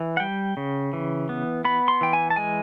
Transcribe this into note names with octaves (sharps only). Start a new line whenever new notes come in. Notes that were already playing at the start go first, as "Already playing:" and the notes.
Already playing: E3
F#5
G3 G5
C#3
E3
B3
B3 B5
C6
E3 G5
G#5
A5
G#3 G#5